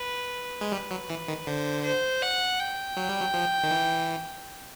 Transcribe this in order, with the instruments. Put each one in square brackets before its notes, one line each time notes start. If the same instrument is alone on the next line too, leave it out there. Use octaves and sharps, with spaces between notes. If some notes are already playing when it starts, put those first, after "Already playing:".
Already playing: [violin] B4
[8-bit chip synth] G#3
[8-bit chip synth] G3 [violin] B4
[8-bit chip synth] F#3
E3
D#3
[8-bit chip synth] D3 [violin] C5
[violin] C5
F#5
G5
[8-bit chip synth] F#3
G3
F#3
F3
D#3
E3